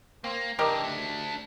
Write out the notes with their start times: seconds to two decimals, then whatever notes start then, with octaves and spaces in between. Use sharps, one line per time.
0.24 A#3 C4
0.59 E3 D4 G4 A#4 D#5
0.84 A3 D4